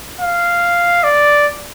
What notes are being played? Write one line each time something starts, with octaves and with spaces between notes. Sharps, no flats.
F5
D5